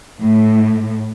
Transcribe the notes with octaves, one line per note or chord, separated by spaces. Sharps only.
A2